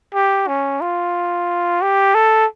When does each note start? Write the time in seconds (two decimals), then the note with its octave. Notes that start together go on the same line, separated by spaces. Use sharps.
0.14 G4
0.47 C#4
0.81 F4
1.82 G4
2.15 A4